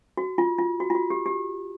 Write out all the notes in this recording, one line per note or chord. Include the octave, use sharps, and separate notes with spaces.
F#4
F4
F4
F#4
F4
F#4
G4
G4